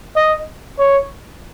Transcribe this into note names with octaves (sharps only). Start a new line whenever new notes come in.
D#5
C#5